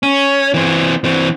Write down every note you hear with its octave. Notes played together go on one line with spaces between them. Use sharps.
C#4
E3 C4
E3 C4